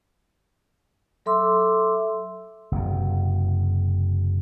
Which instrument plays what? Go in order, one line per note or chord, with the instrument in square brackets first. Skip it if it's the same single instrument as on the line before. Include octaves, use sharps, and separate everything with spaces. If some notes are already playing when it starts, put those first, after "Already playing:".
[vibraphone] F#3 A4 E5 C6 D6 E6
[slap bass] F#1 C3